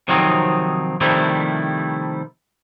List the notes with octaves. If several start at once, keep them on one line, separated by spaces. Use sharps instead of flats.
C3 D#3 F3 F#3 C4 D#4
C3 D#3 F3 G3 A3 E4